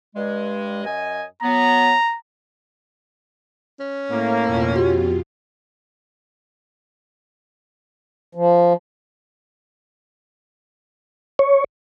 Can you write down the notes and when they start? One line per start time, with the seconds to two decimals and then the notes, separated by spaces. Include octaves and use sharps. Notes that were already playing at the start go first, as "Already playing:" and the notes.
0.15 G2 G#3
0.84 F#2 D#5 G#5
1.43 F#3 B3 A#5
3.80 C#4
4.10 A2 A#3
4.45 F2 B2 F4
4.76 F#4 G4
8.35 F3
11.39 C#5